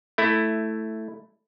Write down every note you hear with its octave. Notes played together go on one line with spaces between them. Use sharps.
A3 E4